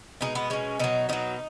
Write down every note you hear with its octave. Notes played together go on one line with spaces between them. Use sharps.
B2 G#3 D#4
B3
B2 G#3 C#4
B2 F#3 D#4
B2 F#3 D#4